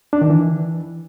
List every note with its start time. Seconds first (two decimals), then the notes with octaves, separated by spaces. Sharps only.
0.13 D4
0.22 D#3
0.30 E3